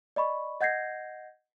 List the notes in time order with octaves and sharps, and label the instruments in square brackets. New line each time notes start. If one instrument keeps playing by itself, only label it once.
[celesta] D5 D#5 B5 C#6
D#5 F#5 G6 G#6 A#6 C7